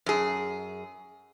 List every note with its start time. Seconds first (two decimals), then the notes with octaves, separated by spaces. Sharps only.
0.06 F#2 G#4